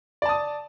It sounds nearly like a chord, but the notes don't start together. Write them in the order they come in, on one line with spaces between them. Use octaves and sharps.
D5 A5 D#6